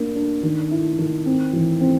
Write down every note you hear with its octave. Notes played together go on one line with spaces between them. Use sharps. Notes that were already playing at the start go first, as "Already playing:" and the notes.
Already playing: A#3 D4
D4
D#3
E4
D#3
C4
E3
C4